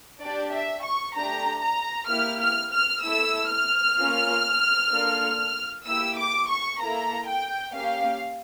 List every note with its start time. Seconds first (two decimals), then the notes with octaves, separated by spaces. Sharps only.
0.22 D4 G4 D5
0.53 E5
0.84 C#6
1.16 A3 D4 G4 A#5
1.63 A#5
2.10 A#3 E4 G4 F6
2.41 F6
2.73 F6
3.04 A3 E4 A4 E6
3.51 F6
3.98 A#3 C#4 F4
4.92 A#3 D4 F4 A4
5.86 A#3 E4 G4 E6
6.18 D6
6.49 C#6
6.80 A#3 E4 A4 A#5
7.28 G5
7.74 A#3 C#4 G4 F5